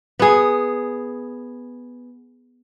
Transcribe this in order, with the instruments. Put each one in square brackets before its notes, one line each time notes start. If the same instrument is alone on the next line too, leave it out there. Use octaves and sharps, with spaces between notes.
[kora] B3 G#4